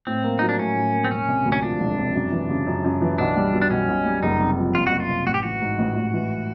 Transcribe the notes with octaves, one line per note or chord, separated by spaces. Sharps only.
A2 C4
A#3
F#3 D#4
D4
A2 C#4
A2
A#3
C4
E1 C#4
C3
D2
C#4
F3 D4
E1
C3
F#2
E3
C#3
F#2
F#2
E3
B1 D4
G3
B2
D4
B1 C#4
B1
G3
F#1 D#4
C3
F2
F#1 F4
F#1 F#4
F4
C3
A1 F#4
G4
E3 F#4
G#2
A1
A1
E3